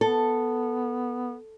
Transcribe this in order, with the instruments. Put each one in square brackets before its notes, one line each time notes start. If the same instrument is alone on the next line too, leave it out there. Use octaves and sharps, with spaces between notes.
[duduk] B3 [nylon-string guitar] A4